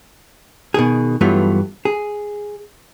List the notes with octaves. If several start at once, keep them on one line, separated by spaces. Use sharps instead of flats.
B2 D#3 G#4
G2 E3 F#3 A3 B3 F4
G#4